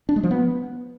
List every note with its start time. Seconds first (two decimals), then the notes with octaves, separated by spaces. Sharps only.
0.09 D4
0.16 G#3
0.23 F3
0.31 B3